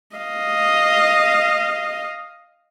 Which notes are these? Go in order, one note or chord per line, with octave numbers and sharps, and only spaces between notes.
D#5 F5